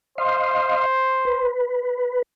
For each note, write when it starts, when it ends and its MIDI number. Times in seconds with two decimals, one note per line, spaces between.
0.18 1.51 72
0.18 0.85 75
0.18 0.85 77
0.18 0.85 84
1.25 2.22 71